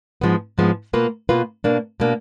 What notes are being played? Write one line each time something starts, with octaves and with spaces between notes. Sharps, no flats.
G#2 F3 G#3 B3
G#2 F3 G#3 B3
B2 A#3 F4 B4
B2 A#3 F4 B4
B2 A#3 D4
B2 A#3 D4